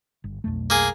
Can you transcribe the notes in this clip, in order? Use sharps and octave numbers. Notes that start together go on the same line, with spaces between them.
G1
B1 F2 A3
A#3 G#4